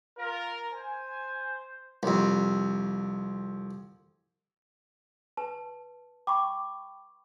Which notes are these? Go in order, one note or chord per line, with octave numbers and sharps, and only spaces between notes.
F4 A#4
C5 G#5
C2 F2
B4 A5
G5 B5 C#6 D6